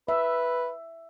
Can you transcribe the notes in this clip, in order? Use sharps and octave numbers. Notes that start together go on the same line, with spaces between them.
B4 E5